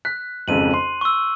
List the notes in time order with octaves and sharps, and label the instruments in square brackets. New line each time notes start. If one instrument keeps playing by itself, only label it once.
[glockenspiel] F#6 [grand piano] B6
[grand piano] G#1 F2 C#3 [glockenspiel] D#7 F#7
[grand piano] C6
[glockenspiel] C#6 E6